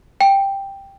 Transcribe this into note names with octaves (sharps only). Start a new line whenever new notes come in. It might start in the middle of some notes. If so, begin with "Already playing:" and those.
G5